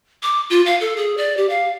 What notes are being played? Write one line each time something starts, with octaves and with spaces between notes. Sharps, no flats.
D6
F4
F5
A4
G#4
D5
G4
F5